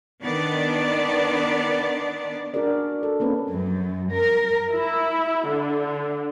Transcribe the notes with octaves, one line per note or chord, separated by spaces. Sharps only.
D#3 B3 D4 D5
D4 F#4 G#4 A#4 D5
A4
A#3 C4 C#4 B4
F#2
A#4
E4
D3